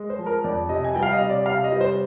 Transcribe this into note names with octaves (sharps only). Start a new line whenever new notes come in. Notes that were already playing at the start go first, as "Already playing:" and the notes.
Already playing: G#3
C5
F3
A#4
F2 D5
C3 D#5
G#5
G3 G5
F5
D#5
C3
D5
C3 F5
D#5
G3
C5